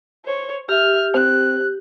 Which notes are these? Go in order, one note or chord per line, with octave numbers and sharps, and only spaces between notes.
C5 C#5
G4 E5 F6
C4 F#6